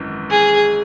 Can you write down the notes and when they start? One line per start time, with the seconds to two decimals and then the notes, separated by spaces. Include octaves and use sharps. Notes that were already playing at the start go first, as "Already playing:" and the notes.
Already playing: G#1 F#2 E3
0.31 G#4